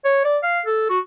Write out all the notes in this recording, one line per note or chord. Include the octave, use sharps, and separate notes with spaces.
C#5
D5
F5
A4
F#4